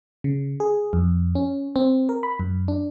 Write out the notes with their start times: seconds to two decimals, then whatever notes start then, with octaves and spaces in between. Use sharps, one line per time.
0.24 C#3
0.60 G#4
0.93 F2
1.35 C#4
1.76 C4
2.09 A#4
2.23 B5
2.40 F#2
2.68 D4